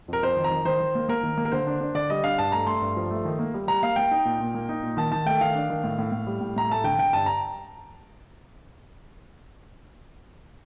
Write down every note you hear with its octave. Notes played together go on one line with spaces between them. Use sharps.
F2 A#4
F2 C5
D#3
A#5
D#3
D#3 C5
D#3
A#3
A#3 A#4
D#3
A#3
A#4
D3 C5
D4
D4
D3 D5
G3 D#5
D4 F5
G2 A5
A3 A#5
A3 C6
G2
F3
A3
D#3
A#3
G3
G3 A#5
A#3 F5
A#3 G5
D#4
A#2
A#2
A#3
D#4
A#2
D#3 A5
D#3 A5
A3 G5
D#3 F5
D4
D#3
A2
A2
A2
G3
A2
A2 A#5
A3 A5
D3 G5
D3 G5
G2 A5
A#5